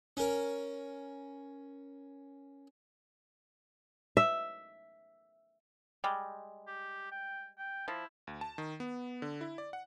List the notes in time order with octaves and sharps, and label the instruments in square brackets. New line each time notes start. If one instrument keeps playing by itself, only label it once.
[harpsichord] C#4 A#4
[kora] E5
[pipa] G3 G#3
[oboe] G4
G5
G5
[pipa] F3 [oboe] E4
[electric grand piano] D2
A5
D#3
B3
D3
E4
D5
F#5